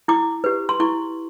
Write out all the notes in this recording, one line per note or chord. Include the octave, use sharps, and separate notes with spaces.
E4 D6
G4 B4
C6
E4 C#6